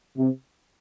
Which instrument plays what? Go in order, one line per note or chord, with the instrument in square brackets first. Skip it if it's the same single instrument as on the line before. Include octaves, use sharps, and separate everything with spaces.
[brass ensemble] C3